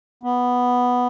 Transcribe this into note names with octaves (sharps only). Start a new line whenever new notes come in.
B3